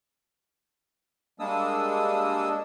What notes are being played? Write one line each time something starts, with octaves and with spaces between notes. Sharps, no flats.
G3 G#3 A#3 D4 D#6 E6